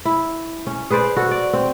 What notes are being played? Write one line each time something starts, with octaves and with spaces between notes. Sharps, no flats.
E4
C#4
G#4 B4 C5 D5
F#4 A4
D5
C4